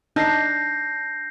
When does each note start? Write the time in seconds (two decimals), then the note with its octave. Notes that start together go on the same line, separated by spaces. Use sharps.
0.16 D4 D#4 G6 A#6 C7